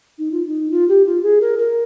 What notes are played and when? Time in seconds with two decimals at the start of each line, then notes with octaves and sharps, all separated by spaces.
0.18 D#4
0.32 F4
0.46 D#4
0.71 F4
0.89 G4
1.06 F4
1.23 G#4
1.41 A#4
1.59 A#4